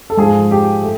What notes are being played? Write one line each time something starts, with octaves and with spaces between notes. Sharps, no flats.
A4
G#2 F3 G#3 G#4
G4
A3